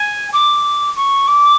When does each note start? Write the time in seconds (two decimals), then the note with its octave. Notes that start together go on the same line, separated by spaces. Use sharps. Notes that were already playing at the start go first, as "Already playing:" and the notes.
Already playing: G#5
0.33 D6
0.96 C#6
1.27 D6